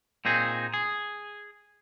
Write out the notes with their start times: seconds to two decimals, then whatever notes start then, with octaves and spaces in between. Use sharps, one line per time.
0.25 A#2 C4 D#4 G#4
0.74 G#4